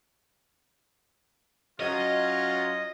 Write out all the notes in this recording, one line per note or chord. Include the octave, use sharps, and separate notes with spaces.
F#3 C#4 F4 D#5